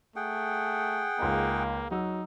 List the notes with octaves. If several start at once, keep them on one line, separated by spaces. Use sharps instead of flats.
A3 G#4 F#5 G5
C#2 A#3 D#4
F#3 D#4 F#5 E6